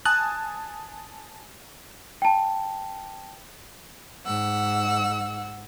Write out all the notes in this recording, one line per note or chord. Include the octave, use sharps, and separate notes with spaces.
G#5 A5 D#6 F#6
G5 A5
G#2 F#5 E6